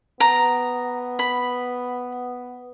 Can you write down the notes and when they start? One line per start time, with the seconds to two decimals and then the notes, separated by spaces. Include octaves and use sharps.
0.20 B3 A#5
1.19 B5